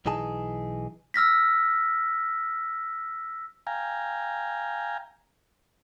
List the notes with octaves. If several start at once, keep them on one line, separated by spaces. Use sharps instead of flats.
B1 E3 D#4 G#4 A5
E6 F6 A#6 B6
F5 G5 G#5 A#5